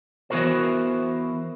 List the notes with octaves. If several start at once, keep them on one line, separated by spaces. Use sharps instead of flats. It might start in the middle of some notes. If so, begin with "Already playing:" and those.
E3 B3 E4 F#4 A#4 C5